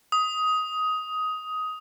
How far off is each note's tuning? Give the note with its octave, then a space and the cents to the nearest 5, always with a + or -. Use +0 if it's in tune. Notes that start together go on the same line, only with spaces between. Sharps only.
D#6 +15